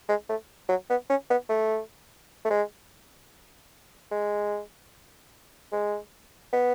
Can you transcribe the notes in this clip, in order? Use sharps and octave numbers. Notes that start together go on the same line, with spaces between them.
G#3
A3
F#3
B3
C#4
B3
A3
A3
G#3
G#3
G#3
B3